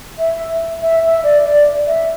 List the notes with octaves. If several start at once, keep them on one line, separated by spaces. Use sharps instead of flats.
E5
E5
E5
D5
D5
E5